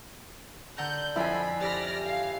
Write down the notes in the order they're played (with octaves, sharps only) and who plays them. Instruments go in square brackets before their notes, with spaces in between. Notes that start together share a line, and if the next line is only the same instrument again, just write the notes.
[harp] D3 F#5 A#5 [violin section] G6
[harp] F2 F3 C6 [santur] E4 G#5 [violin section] B5
[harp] G4 B5 [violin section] D5 F6 A#6
[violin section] F5